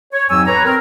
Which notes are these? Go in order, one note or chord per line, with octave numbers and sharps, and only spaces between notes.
C#5
F2 G#2 F#3 G4 G#5 E6
B4 C#5 A#5
C4 A#4